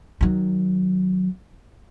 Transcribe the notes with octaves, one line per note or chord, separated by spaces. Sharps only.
D#3 F#3